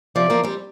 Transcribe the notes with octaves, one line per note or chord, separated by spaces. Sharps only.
C3 F3 D5
F3 A#3
G3 C4